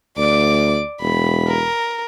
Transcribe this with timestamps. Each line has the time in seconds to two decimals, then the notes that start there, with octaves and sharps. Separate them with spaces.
0.17 D2 D5 D6
1.02 E1 B5
1.47 A#4